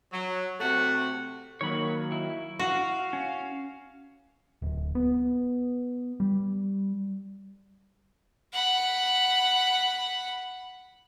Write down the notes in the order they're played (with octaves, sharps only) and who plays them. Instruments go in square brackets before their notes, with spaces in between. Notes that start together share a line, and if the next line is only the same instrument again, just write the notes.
[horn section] F#3
C3 A3 F#4
[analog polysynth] D#3 F#3 A#3 [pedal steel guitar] C#5 B5
[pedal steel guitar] E4
[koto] F#4 [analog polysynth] F5
[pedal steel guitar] C#4
[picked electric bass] D1
B3
G3
[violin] F#5 B5